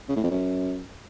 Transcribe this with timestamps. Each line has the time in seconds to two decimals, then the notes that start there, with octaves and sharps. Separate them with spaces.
0.09 C#3
0.16 A2
0.23 F2
0.31 F#2